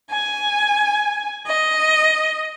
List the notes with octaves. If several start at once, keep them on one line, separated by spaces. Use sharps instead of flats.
G#5
D#5